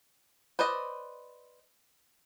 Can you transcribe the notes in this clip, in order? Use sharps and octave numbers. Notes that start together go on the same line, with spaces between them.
B4 C5 D5 D#5